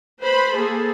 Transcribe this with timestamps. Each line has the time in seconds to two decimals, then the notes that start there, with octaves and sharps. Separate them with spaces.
0.21 B4 C5 B5
0.55 A#3 G#4 A4